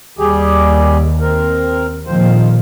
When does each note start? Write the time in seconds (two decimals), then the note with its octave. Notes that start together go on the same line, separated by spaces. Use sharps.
0.19 D#2 G3 G4 G#4
1.21 C4 A#4
2.07 A#2 D#3 F3 C4 C5